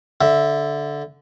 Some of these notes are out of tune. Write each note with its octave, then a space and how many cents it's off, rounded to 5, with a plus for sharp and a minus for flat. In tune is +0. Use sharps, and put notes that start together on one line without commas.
D3 -10 E5 +0